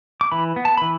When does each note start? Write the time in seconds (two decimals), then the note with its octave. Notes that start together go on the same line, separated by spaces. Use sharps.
0.21 D6
0.32 E3 B5
0.56 B3
0.65 A5
0.77 E3 B5